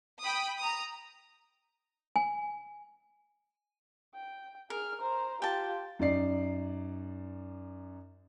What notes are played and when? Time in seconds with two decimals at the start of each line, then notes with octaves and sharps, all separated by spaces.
0.25 G5 B5 D#6
0.59 A#5 D#6
2.16 G#5
4.14 G5
4.70 G#4 A#4 F6
5.01 C5 A#5
5.42 F4 G4 G5 A5
5.99 F#2 D#4 D5 C7